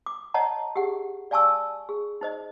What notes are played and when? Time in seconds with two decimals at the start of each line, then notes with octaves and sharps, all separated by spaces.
0.06 D6
0.34 C#5 D#5 F#5 A5 A#5
0.76 G4 G#4 F#5
1.31 D5 F5 G#5 A5 C#6 E6
1.89 G#4
2.21 D#4 C5 D#5